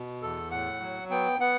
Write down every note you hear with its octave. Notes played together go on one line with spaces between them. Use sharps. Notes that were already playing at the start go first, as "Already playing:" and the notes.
Already playing: B2
E2 A4
A2 F#5
F#3
B3 G5
B3 F#5